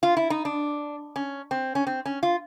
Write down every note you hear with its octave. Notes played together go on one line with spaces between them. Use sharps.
F4
E4
D#4
D4
C#4
C4
C#4
C4
C#4
F4